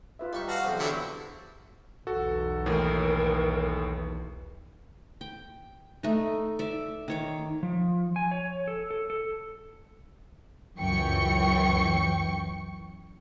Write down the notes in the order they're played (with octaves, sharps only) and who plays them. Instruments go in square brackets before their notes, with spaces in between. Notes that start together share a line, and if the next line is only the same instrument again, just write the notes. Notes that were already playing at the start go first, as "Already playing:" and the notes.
[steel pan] F4 B4 E5
[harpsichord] G3 D#4 C#6 [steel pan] E5
[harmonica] F#4 F5 [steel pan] B4 A5
[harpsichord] B1 E2 C3 [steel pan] C5 D5 D#6
[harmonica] D3 F#3 E4
[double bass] B1 E2 [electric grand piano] F#4 A4
[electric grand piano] D#2 A2 E3 [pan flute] A#4
[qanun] G5
A3 D#4
D5 E5
D#3 C#5 D6
[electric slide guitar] F3
G#5
C#5
A4
A4
A4
[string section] C#2 F#2 E3 G5 C#6 C#7